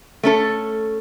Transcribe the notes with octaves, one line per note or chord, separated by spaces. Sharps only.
A3 C#4 A4